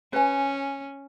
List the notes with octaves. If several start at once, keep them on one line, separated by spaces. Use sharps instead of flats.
C#4 B4 G#5